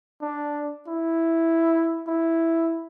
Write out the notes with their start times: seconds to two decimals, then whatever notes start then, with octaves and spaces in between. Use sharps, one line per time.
0.22 D4
0.88 E4
2.08 E4